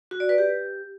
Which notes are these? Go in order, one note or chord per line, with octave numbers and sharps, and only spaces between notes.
F#4
D5
B4
G4